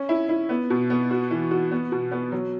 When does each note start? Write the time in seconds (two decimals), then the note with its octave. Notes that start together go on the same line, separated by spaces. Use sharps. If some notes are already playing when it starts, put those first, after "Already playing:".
Already playing: C#4
0.09 E4
0.29 E4
0.49 B3
0.70 B2
0.90 B3
1.11 F#4
1.31 E3
1.51 F#4
1.71 B3
1.92 B2
2.11 B3
2.32 F#3